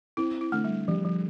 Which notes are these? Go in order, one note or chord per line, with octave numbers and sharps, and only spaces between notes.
C4 E4
E4
D3 A3
G3
F3 G3
F3